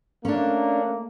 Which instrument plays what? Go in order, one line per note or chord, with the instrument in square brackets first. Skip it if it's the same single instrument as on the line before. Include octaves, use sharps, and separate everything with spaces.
[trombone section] A3 A#3 [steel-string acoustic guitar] C#4 D4